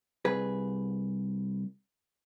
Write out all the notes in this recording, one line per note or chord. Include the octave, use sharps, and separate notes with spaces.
C2 G#4 B4